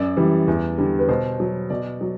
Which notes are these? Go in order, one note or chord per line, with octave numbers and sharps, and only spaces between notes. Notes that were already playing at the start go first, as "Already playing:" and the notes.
Already playing: F#2 D5
E3 G3
E2
D3 G3
B4
B2 C5
F#3
B2 D5
F#3